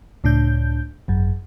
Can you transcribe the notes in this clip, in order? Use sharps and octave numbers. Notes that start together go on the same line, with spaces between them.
C#2 A2 D4 G6
G#1 F#2